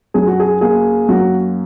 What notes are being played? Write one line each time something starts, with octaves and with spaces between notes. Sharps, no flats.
F#2 G#4
F#4
G#4
A#3 G#4
F#2 F#4